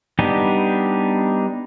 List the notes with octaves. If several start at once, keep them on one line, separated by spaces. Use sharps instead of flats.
G3 B3 D4 D#4 G4